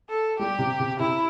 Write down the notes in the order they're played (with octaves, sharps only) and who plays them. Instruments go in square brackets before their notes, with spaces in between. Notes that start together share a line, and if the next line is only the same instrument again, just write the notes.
[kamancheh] A4
[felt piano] G3 [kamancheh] G4
[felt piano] C3
C3
[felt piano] C3 [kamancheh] E4